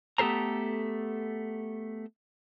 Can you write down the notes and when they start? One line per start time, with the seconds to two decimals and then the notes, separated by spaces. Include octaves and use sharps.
0.18 A3 B3 G4 A4 C5 A#5